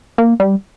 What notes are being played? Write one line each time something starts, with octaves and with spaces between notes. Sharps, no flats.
A#3
G3